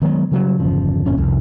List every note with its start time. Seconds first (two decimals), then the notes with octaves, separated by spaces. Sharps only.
0.02 D#3 F#3 G#3 B3
0.32 C#3 F#3 G3
0.59 G1 E2 C#3 F3
1.06 G1 F2 A#2 C#4
1.18 C2 F2